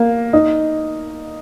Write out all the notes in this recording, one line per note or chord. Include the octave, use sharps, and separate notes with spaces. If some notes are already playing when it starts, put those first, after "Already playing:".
Already playing: A#3
D#4